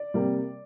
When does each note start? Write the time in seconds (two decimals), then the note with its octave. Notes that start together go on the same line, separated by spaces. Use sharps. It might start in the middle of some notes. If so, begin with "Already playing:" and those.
Already playing: D5
0.14 C3 G3 A#3